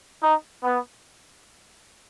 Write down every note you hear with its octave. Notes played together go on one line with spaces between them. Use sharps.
D#4
B3